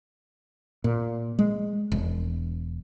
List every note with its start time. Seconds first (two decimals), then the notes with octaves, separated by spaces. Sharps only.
0.84 A#2
1.39 G#3
1.92 E1